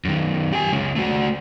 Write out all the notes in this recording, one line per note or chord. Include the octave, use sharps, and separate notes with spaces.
F#2 D#3
G4 G#5
C#3 G#3
A3 F#4